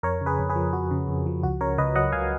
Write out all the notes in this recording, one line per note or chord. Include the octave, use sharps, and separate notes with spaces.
F2 A#4 C#5
C#3
G#4 B4
F2
G#4 B4
F3
F2 F#4
C#3
F2
F3
C#2 F#4
C#3 A#4 C#5
C#2 B4 D#5
F#3 D#5 F#5
C#2 F5 G#5